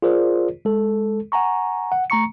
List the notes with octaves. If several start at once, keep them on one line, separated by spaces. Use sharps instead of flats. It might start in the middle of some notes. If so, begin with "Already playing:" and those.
F4 G#4 A#4 C5 D5
G#3 A4
F#5 G#5 A#5 C#6
F#5
A3 A#5 C#6 C#7